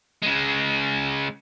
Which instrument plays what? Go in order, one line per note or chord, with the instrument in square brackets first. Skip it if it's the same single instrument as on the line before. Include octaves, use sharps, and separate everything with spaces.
[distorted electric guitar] C#3 G#3